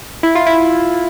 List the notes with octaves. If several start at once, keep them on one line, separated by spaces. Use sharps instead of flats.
E4
F4
E4